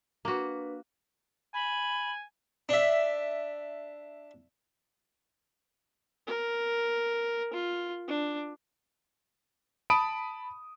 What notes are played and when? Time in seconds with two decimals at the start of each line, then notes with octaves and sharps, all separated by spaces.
0.25 A#3 D4 F#4 B4
1.54 G#5 B5
2.69 D4 E5
6.27 A#4
7.53 F4
8.08 D4
9.90 A5 B5 D#6 D7 D#7